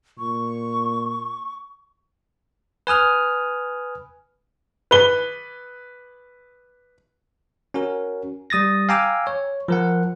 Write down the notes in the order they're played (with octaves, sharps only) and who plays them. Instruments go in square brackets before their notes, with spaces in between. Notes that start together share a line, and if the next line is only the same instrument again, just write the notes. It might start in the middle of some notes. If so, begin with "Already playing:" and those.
[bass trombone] A#2 [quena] C#6
[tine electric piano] B4 G#5 D#6 F6
[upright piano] B4 G7
[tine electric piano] C#4 F#4 A#4
G3 D#6 A6 A#6
F5 G5 G#5 A#5 D6 E6
C#5
F3 A#4 F#5